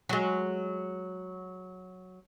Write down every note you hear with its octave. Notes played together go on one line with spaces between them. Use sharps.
F#3 G#3